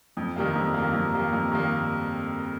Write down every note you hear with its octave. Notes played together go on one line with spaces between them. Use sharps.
F2
D#3 G3 A#3
F2
D#3 G3 A#3
F2
D#3 G3 A#3
F2
D#3 G3 A#3